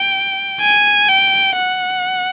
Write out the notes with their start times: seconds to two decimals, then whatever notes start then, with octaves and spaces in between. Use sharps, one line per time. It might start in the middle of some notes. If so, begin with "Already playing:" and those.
Already playing: G5
0.60 G#5
1.08 G5
1.56 F#5